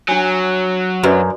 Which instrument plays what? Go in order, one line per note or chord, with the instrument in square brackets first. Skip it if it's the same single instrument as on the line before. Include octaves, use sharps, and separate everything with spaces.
[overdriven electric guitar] F#3 [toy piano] D4 G#5
[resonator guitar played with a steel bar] F#2 [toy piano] F#4 B4 D5